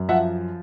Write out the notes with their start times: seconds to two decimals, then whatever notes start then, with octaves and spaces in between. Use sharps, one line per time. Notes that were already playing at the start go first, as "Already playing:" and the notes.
Already playing: F#2
0.09 F3 E5 F#5